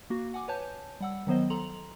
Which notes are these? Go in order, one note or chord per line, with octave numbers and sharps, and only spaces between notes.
A#3 F#4
F#5 G#5 D6
B4 C#5 G#5 A5 G6
G3 F#5 E6
D#3 F#3 B3 C5 D#5
A4 A#5 C6 F7 F#7